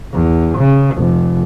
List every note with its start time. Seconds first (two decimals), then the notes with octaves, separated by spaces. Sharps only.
0.13 E2
0.58 C#3
0.96 F1